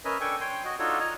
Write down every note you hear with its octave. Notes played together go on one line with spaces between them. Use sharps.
C#4 A#4 B4 D#5 E5 G#5
D4 A4 G5 G#5 C#6
C#5 G5 C6
F#4 D#5
D4 D#4 F4 F#4 A4 C#5
C#5 D#5 A#5